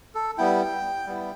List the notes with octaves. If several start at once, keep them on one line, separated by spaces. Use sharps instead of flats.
A4
G3 B3 E4 G5
G3 B3 E4